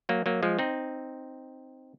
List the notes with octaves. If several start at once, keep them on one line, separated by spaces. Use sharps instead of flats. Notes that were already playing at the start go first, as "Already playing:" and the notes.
F#3 A#3
F#3 A#3
F3 G#3
C4 D#4